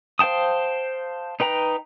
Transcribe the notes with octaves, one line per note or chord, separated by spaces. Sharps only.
C5 F5 G5 A5 D#6
D#4 B4 G5 A#5